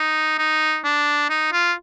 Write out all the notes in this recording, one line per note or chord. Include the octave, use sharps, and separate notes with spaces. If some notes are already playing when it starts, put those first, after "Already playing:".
Already playing: D#4
D#4
D4
D#4
F4